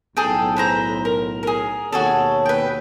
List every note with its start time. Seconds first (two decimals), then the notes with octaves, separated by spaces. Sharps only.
0.17 B1 A2 G#4 A4 G5
0.56 B4 C5 A#5
1.05 A#4
1.43 G#4 A#4
1.92 D#2 B2 F#4 G#4 A4 C#5
2.46 B4 G5